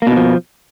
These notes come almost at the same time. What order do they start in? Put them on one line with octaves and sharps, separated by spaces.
A#3 B2 D#3 F3